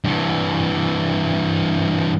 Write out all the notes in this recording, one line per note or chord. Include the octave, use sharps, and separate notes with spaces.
G2 E3